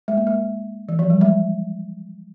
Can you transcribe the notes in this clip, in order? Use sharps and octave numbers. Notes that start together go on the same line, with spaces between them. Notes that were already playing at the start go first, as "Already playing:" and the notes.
G#3
A#3
G#3
E3
F3
G3
G#3